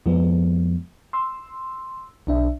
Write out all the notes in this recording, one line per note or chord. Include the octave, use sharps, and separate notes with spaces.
F2 F3 G#3 B3
C6 E6
B1 D4 E5